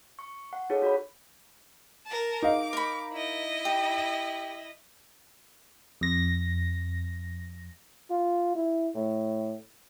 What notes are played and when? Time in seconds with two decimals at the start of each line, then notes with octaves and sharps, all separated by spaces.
0.19 C#6
0.53 F#5
0.70 D#4 F4 G#4 A4 C#5
0.82 F#4 C#5 B5
2.06 A#4 A5
2.43 D#4 F5 D6
2.73 A#4 B5
3.13 E4 D#5
3.65 G4
6.01 F2 A#6
8.10 F4
8.55 E4
8.95 A2